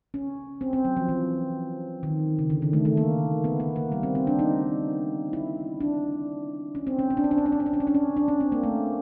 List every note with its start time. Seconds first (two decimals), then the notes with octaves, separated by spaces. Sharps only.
0.14 C#4
0.61 C4
0.73 C4
0.85 F#3
0.97 F3
1.08 E3
2.03 D#3
2.39 C#3
2.50 D3
2.62 D#3
2.73 A3
2.85 A3
2.97 A#3
3.44 B3
3.60 B3
3.76 A#3
3.92 G3
4.03 C4
4.15 C4
4.27 D4
4.39 D#4
5.33 E4
5.80 D4
6.75 C#4
6.87 C4
6.99 C#4
7.10 C#4
7.17 D4
7.24 C#4
7.31 D4
7.38 C#4
7.46 D4
7.52 C#4
7.60 D4
7.66 C#4
7.73 D4
7.80 C#4
7.87 D4
7.95 C#4
8.17 D4
8.28 C#4
8.40 C4
8.52 A#3
8.63 A3